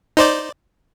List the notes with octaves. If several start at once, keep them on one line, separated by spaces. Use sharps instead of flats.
D#4 C5 D5